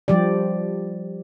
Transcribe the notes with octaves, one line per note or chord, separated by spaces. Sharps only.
F3 G3 G4 D5